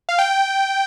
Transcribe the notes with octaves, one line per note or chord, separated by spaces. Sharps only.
F5
G5